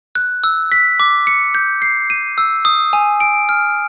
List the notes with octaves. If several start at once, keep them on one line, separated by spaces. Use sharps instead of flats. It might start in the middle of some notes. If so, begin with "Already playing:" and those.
F#6
E6
B6
D6
C#7
G6
C7
D#7
E6
D#6
G#5
D7
F6